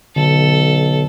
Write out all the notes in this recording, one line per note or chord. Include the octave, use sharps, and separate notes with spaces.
B1 D3 A4